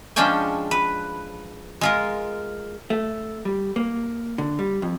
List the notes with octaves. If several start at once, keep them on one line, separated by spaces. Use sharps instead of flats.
F3 G#3 C#4 D4 G5 G#5
B4
G#3 F4 A#4
A3
G3
A#3
D3
G3
F2